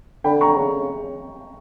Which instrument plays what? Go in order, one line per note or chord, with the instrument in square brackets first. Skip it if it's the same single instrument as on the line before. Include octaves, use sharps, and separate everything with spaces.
[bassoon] D3 [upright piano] G5 B5
[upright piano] A#5 C#6
[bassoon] C#3